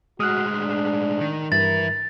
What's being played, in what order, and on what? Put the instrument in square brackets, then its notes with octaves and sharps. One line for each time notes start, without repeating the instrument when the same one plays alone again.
[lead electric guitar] A2 G#3 [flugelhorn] F#4 [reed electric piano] D#6 F6 F#6
[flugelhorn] D4
[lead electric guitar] D#3
[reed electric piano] G2 [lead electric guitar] E3 E4 [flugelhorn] A#4 [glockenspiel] A6